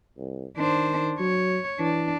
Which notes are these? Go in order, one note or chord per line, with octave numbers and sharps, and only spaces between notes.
C2
D#3 D4 C5
F#3 C#5
E3 D4